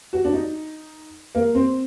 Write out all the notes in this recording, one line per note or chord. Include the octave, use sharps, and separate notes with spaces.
F#4
D4
D#4
A#3
C4